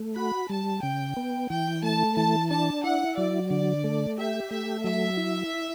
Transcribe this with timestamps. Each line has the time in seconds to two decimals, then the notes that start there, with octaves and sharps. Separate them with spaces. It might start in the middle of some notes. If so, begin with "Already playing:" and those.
Already playing: A3
0.16 F#4 B5
0.49 G3 A5
0.83 C#3 G5
1.17 B3
1.50 E3 G5
1.83 A3 A5
2.16 E3 A5
2.50 D4 A5
2.83 E4 F#5
3.17 F#3 D5
3.50 D3 D5
3.84 A3
4.17 G4 E5
4.50 A3 E5
4.84 F#3 E5
5.17 E4